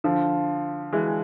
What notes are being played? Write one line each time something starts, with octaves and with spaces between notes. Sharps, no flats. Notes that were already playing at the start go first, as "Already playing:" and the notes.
D3 F3
E3 G#3